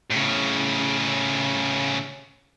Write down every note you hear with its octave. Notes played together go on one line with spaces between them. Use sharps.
A2 C#3